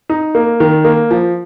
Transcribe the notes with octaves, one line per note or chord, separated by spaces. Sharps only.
D#4
A#3
D#3
A#3
F3